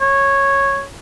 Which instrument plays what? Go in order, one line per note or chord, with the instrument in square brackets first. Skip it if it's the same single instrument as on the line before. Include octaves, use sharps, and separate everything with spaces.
[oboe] C#5